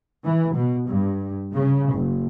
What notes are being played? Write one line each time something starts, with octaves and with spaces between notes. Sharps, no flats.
E3
B2
G2
C#3
F#1